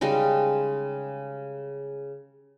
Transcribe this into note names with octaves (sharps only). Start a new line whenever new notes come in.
C#3 G3 G#3 D#4